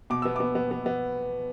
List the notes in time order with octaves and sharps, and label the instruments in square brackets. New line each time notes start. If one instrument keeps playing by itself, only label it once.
[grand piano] B2 D6
B3 E6
B3 D6
B3
B3
B3